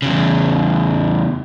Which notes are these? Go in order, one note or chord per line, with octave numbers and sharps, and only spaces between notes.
E2 C#3